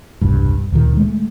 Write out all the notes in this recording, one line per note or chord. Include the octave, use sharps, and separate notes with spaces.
E1 C2 G2
D2 A#2 D#3
G#3 A3